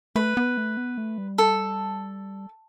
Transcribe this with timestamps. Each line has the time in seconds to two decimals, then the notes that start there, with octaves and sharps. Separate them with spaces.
0.16 A3 B4
0.37 B3
0.57 A3
0.77 B3
0.98 A3
1.18 G3
1.38 A4